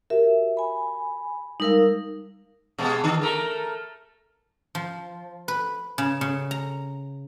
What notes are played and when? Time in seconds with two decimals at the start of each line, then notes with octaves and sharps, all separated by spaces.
0.10 F#4 G4 A#4 E5
0.57 G#5 B5
1.60 G3 G#3 D#4 A#4 F5 E6
2.78 B2 G#3 B3
3.04 D3
3.22 A3 A#4
4.75 F3
5.48 B4
5.98 C#3
6.21 C#3
6.51 A#5